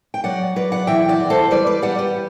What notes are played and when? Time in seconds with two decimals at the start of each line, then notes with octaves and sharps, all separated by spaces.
0.14 G5
0.24 F#3 D5 F#5
0.56 F#3 B4 D5
0.72 D5 F#5
0.87 E3 E5 G5
1.08 D5 F#5
1.20 E3
1.30 A4 C5
1.51 G3 B4 D5
1.66 B4 D5
1.82 G3 D5 F#5
1.98 G4 B4